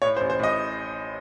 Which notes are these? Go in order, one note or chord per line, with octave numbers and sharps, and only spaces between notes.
A2 C#5
C5
A1
C5
A2 D#5